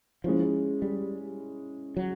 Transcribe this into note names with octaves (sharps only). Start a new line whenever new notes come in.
F3 G#3 C#4 E4
G3
F#3